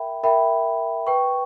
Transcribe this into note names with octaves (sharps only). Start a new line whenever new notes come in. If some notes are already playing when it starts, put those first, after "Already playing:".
Already playing: A#4 E5 G5 B5
A#4 E5 G5 B5
B4 G5 C#6